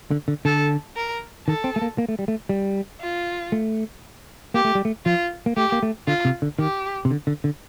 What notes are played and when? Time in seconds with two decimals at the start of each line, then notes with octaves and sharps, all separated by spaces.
0.11 D3
0.28 D3
0.45 D3 A4
0.96 A#4
1.47 D#3 A4
1.64 C4
1.76 A3
1.82 A#3
1.98 A#3
2.09 A3
2.19 G3
2.28 A3
2.49 G3
3.00 F4
3.52 A3
4.54 A#3 G4
4.65 A3
4.75 G3
4.85 A3
5.06 F3 F4
5.46 A#3
5.57 A3 G4
5.72 A#3
5.83 A3
6.08 D3 F4
6.25 C3
6.42 D3
6.59 D#3 G4
7.05 C3
7.11 D3
7.27 D3
7.44 D3